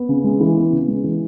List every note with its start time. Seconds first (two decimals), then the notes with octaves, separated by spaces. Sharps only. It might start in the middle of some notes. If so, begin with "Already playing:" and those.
Already playing: B3
0.09 C#3
0.24 G#3
0.40 E3
0.57 B3
0.73 C#3
0.88 G#3
1.04 E3